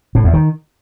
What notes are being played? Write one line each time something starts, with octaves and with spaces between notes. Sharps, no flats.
A2
E2
D#3